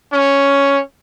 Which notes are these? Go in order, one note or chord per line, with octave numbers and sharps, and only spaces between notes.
C#4